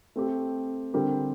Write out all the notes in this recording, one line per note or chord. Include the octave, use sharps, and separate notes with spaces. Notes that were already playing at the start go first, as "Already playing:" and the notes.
A3 C4 G4
D3 G3 C4 G4 A#4